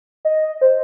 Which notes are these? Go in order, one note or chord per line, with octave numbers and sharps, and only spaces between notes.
D#5
C5